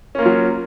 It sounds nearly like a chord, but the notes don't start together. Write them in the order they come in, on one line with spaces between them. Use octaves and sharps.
C#4 A#3 F4 F#3